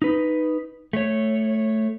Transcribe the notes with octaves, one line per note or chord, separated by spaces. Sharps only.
D#4 B4
A3 C#5